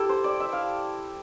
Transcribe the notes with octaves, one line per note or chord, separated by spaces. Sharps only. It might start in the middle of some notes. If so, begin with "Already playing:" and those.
Already playing: E4 G4 A4
C5
D5
E5
F5